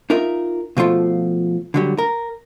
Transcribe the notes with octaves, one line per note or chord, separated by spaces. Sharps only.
D#4 F4 A#4 E5
B2 F3 A3 F4
D3 F#3 G3
A#4